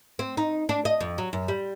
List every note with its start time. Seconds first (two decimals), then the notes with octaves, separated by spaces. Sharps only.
0.19 C4
0.37 D#4
0.69 D4
0.85 D#5
1.00 F2
1.18 F#3
1.33 F#2
1.48 G3